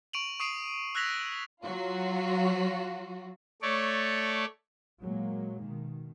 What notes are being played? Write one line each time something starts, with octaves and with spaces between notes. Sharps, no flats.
C#6 D7 D#7 F7 F#7
C#6 D#6 C7 D7 D#7
E6 F#6 G#6 A#6 B6 F7
F#3 F4 F#4
A3 C#5 D5
A#2 F#3 G#3 A#3
B2 D#3